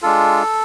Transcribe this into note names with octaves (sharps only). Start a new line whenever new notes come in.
G#3 D4 F4 A4